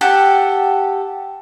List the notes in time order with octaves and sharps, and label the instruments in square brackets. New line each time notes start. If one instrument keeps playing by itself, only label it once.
[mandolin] G4 A4 F#5